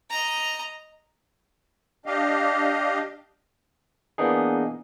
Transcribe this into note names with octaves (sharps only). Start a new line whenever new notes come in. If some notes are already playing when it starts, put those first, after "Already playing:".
D#5 A#5
D4 G4 D#5 F5
E3 A#3 B3 D4 D#4 G#4